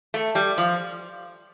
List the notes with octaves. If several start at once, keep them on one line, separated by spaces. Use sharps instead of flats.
A3
G3
F3